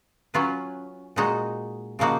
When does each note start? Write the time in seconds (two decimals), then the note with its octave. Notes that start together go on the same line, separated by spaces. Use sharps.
0.34 F#3 C#4 F4 B4
1.16 A#2 G#3 D#4 F#4
1.99 C#3 F3 A#3 D#4 F#4